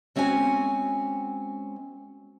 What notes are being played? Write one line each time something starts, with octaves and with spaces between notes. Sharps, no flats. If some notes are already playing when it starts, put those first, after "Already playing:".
G#3 C4 C#4 F#4 G#5